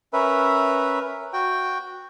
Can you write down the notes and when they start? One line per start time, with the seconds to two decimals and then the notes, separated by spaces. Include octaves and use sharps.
0.13 C#4 A#4 B4 E5
1.33 F#4 G5